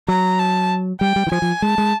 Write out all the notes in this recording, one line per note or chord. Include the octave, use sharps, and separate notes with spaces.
F#3 A#5
A5
G3 G5
G3
E3
F3 G#5
F3
G#3 A5
G#3